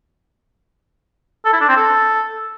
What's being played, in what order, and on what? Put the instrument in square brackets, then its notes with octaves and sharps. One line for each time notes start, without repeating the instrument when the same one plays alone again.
[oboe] A4
E4
D4
C4
A4